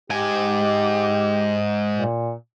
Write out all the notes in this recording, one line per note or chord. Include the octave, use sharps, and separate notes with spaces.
G#2 G4 G#5
A#2